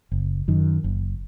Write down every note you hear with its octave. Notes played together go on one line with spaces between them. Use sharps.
F#1
F#2 D#3
F#1